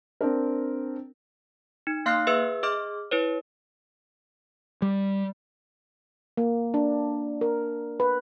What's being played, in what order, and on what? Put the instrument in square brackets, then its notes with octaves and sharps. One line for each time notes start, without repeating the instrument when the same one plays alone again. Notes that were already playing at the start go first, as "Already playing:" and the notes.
[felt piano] C4 D4 A#4
[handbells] D#4
A#3 F5 C6 F6 F#6 C7
G#4 B4 E5 E6
G#4 D#5 D6 F6
E4 B4 C#5
[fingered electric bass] G3
[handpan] A#3
D4
A#4
B4